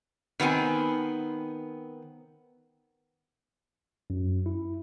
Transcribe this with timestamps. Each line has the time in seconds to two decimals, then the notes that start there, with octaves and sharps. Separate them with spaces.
0.40 D#3 B3 C4 G#5
4.10 F#2
4.46 E4